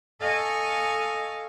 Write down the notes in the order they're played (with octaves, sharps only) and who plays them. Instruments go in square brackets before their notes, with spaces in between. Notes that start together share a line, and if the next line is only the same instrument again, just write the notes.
[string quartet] A4 D#5 F5 G#5 C#6